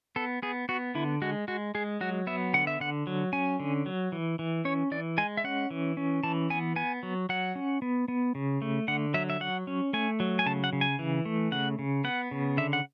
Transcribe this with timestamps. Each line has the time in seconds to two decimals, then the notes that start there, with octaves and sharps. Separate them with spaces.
0.16 B3 A4
0.43 B3 G#4
0.69 B3 F#4
0.95 D3 E4
1.22 G#3 F#4
1.48 G#3 F#4
1.75 G#3 G#4
2.01 F#3 F#4
2.27 B3 E5
2.53 D3 F#5
2.67 E5
2.80 D3 F#5
3.07 F#3
3.33 C#4 G#5
3.60 D3
3.86 F#3
4.12 E3
4.39 E3
4.65 C#4 C#5
4.91 E3 D5
5.18 G#3 G#5
5.37 E5
5.44 C#4 F#5
5.71 E3
5.97 C#4
6.23 E3 A5
6.50 B3 G#5
6.76 B3 G#5
7.03 F#3
7.29 F#3 F#5
7.55 C#4
7.82 B3
8.08 B3
8.35 C#3
8.62 A3
8.88 D3 F#5
9.14 F#3 E5
9.30 E5
9.40 F#3 F#5
9.67 C#4
9.93 A3 G#5
10.20 F#3
10.39 G#5
10.46 C#3 A5
10.64 F#5
10.73 C#3
10.81 G#5
10.99 E3
11.25 A3
11.52 C#3 F#5
11.79 C#3
12.04 B3 F#5
12.31 C#3
12.57 D3 E5
12.73 F#5